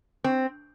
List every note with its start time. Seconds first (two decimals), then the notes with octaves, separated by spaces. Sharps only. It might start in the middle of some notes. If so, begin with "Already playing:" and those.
0.24 C4